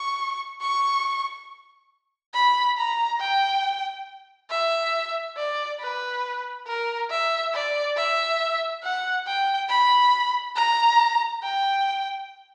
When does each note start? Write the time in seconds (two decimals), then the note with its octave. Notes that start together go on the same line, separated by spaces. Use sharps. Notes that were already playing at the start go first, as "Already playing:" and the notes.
Already playing: C#6
0.61 C#6
2.34 B5
2.78 A#5
3.21 G5
4.50 E5
5.37 D5
5.80 B4
6.67 A#4
7.11 E5
7.53 D5
7.97 E5
8.83 F#5
9.27 G5
9.69 B5
10.56 A#5
11.42 G5